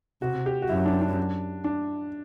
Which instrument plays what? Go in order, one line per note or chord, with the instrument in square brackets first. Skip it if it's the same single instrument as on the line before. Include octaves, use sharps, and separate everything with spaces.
[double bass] C3 [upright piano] F#4
[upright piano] G4
F#4
[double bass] F#2 [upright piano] E4
[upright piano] D4
D4
D4